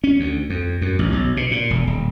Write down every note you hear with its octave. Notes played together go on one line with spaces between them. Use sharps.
C#4
D2
F2
F#2
A1
B1
B2
A#2
E1
D#1